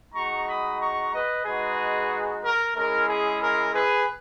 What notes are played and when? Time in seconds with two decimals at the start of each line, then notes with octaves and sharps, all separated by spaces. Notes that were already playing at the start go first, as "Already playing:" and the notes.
0.14 G#3 D#4 F#4 A#5 C#6
0.47 B5 D#6
0.79 A#5 C#6
1.12 B4 D#5
1.45 G#3 D#4 F#4 G#4 B4
2.43 A#4
2.76 G#3 C#4 E4 A#4
3.08 G#4
3.42 A#4
3.74 G#4 B4